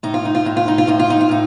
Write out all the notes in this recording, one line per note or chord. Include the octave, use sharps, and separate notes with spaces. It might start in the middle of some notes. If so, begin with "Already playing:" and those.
A2 D#4
F4
D#4
F4
A2 D#4
F4
D#4
F4
A2 D#4
F4
D#4
F4
A2 D#4